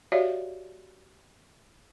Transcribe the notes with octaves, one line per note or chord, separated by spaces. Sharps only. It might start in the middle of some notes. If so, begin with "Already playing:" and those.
F#4 G4 C#5 D5 E5 F5